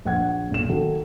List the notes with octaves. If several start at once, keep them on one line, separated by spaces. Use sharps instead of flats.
A#1 F#5 G#6
B1 A#2 E7
D#3 F#4 A4